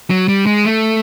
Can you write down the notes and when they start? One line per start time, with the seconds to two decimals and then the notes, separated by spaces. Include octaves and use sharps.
0.10 F#3
0.28 G3
0.47 G#3
0.65 A3